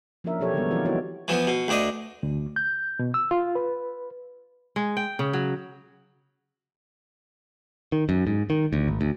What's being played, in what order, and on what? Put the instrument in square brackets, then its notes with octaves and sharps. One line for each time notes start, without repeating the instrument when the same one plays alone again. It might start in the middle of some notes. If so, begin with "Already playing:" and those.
[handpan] F3 A#3 C#4 D4 A#4 E5
B2 F#3 G4 A4 C#5
D3 D#3 G3 G#3 B3
E3 F3 C4 F4 A#4 D5
B3 D#4 E4 F#4 A4 C#5
[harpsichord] E3 F3 B3
B2
D2 D4 D#5
[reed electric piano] D2
G6
B2
E6
F4
B4
[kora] G#3
G5
C#3
F#3
[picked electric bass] D#3
F#2
G#2
D#3
D2
G#1
D2